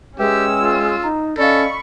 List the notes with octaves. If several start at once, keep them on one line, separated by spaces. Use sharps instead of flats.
G#3 C#4 G4 B4 E5 G5 E6
F4
D#4 A#5
C#4 A4 D5 D#5 F5 B5 C#6